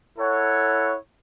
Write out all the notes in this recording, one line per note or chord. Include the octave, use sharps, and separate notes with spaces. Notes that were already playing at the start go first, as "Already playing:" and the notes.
E4 A4 C#5 F#5